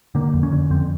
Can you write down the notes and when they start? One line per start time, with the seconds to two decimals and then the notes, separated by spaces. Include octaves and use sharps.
0.15 D3 A#3
0.34 F2
0.43 C#4
0.52 D3
0.70 F2 C4